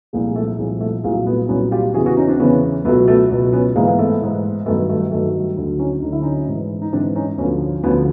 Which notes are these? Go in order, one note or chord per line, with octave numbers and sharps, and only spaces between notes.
C2 A#2 F3 G#3 A#3
G#3
A3
C2 A#2 F3 G#3
A3
C2 A#2 F#3 G#3 A#3
A3 B3
C2 A#2 F#3 B3 C#4
F4 G4
E2 C#3 E3 F#4 G#4
F#4 G#4
C#4 D#4
C4 D4
E2 C#3 E3 B3 C#4
C#2 B2 F#3 A3 B3
A3 B3
C#2 B2 F#3
B3 C#4
G#2 E3 G#3 A#3
A#3
A3 B3
G#2 E3
G2 D#3 F#3 A3 B3
A3
G2 D#3 F#3 A3
D2 D3 F#3
C#4 D#4
D2 D3 F#3 D#4
E4
C#4 D#4
G#2 E3
D#4
G#2 E3 C4 D4
C#4 D#4
D2 D3 F3 B3 C#4
D2 D3 F3 B3 C#4